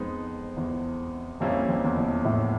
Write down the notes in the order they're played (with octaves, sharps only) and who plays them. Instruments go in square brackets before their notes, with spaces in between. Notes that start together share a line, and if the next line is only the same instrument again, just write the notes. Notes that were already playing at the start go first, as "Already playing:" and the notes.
Already playing: [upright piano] F2 [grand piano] G#3 B3 D#4
[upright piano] E2
[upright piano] F2 [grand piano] A#2 G3 A#3 C#4 E4
[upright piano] F2
E2
F2
A2